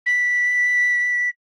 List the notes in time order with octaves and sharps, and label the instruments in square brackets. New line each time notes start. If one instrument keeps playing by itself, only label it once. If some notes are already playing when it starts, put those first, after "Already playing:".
[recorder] B6